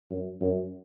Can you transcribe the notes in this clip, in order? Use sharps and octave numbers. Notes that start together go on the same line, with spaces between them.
F#2
F#2